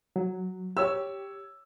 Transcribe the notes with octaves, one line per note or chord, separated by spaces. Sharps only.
F#3
G4 C#5 E6